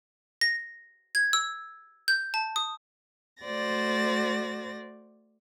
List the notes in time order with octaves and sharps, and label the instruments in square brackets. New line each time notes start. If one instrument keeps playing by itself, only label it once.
[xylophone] A#6
G#6
E6
G6
A5
D#6
[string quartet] A3 F#4 C5 D5 A6 A#6